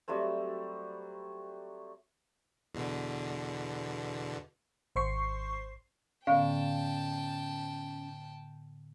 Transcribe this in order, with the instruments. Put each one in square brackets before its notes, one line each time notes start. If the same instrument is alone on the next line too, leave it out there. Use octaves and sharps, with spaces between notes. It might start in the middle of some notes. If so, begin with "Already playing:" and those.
[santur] F#3 G3 A3 C4
[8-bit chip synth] E2 B2 D3
[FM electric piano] G#1 C5 C6 C#6 C7
[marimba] A2 D3 B3 [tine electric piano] C#4 [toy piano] F5 [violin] G5 A5